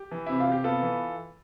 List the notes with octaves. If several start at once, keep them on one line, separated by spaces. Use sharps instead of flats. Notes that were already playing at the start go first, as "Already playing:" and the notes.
Already playing: G4
E3
C3 E4
F4
C3
G4
B3 F4 A4
E3